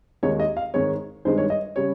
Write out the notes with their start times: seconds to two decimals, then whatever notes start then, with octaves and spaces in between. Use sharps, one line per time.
0.23 D#2 D#3 G#3 C#5
0.40 D#5
0.57 F5
0.74 G#2 D#3 G#3 C#5
1.25 G2 D#3 G#3 C5
1.38 C#5
1.50 D#5
1.76 C#3 G3 C#5